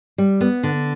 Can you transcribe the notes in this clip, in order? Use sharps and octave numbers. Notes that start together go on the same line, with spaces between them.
G3
B3
D3